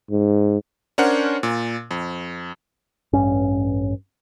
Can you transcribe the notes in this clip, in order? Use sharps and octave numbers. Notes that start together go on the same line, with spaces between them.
G#2
C#4 D4 A#4 C5 C#5 F#5
A#2
F2
A1 G2 C#4